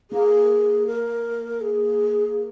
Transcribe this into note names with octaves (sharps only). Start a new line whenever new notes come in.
A#3 G#4
A#4
G#4